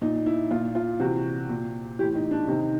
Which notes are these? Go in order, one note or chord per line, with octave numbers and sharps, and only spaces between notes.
A#2 D#4
E4
A#2 F4
F4
C3 E3 F#4
A#2
A2 E3 G4
D#4
D4
C3 D#3 D#4